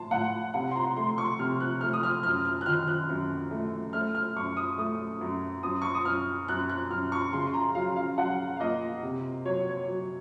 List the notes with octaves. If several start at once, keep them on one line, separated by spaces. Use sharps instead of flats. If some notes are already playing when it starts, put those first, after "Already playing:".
Already playing: A2 A5 C6
A2 F#5
C3 F#5
C6
A#5
A3 C6
C#6
C3 F6
F#6
A3 F6
D#6
F6
F#2 F6
F6
F#6
D#3 F6
F#6
F#2
A3
A3 F6
F6
F#2 C#6
D#6
A3 D#6
F#2
F#2 D#6
C#6
D#6
F#2 F6
F#2 F#6
F#6
F#2 F6
C#6
C#3 C6
A#5
F#3 F5
F5
F#3 F#5
F5
A#3 D#5
C3
F#3 C#5
C#5
F#3